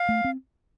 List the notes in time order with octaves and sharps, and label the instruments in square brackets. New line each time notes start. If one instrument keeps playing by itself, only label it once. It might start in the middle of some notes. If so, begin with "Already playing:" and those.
Already playing: [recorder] F5
[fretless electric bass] A3
C4